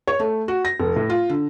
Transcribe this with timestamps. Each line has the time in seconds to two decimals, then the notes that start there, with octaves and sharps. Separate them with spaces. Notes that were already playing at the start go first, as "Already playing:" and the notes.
0.08 C#5
0.20 A3
0.48 F#4
0.65 A#6
0.80 F1
0.96 A2
1.10 F4
1.29 D3